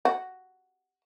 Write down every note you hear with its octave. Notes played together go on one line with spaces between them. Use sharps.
F#4